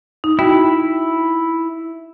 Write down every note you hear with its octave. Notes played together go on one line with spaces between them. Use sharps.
D#4
E4 F#4 G5